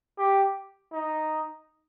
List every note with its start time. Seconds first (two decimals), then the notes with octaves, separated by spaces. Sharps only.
0.18 G4
0.93 D#4